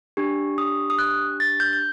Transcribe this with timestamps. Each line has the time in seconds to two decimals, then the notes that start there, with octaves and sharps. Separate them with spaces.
0.17 D4 G4
0.58 D#6
0.90 D#6
0.99 F#6
1.40 A6
1.60 G6
1.73 G6